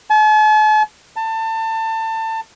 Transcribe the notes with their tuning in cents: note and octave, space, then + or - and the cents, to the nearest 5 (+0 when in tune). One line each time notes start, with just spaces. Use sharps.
A5 -45
A5 +25